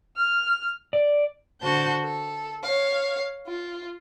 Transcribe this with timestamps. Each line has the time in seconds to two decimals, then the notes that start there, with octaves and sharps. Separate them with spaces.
0.17 F6
0.93 D5
1.62 D3 F#4 C5 A5 G6
2.03 A4
2.63 C#5 F5
3.47 F4